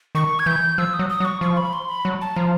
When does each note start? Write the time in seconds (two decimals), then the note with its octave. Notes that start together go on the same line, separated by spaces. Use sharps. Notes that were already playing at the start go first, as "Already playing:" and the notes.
0.15 D#3 C#6
0.39 G#6
0.46 E3 G6
0.78 F3 E6
0.94 D#6
0.99 F#3
1.09 D#6
1.20 F#3
1.25 C#6
1.41 F3 C#6
1.57 B5
1.73 C6
1.88 B5
2.05 F#3
2.21 A5
2.36 F3 A#5